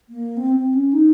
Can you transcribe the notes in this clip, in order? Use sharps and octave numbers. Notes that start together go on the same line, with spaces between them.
A#3
C4
C4
C#4
D#4